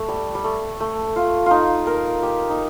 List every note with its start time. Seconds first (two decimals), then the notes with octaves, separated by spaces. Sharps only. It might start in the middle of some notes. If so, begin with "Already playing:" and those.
Already playing: A3
0.08 G3
0.35 G3
0.44 A3
0.80 A3
1.16 F4
1.46 D#4 F4
1.87 A#4
2.22 G4
2.50 D#4